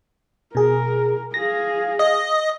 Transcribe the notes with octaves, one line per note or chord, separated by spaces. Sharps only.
B2 G#4 A#4
G#4 F5 A#6
D#5